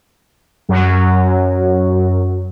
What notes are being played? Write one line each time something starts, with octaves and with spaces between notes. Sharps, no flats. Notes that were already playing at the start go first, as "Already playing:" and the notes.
F#2 F#3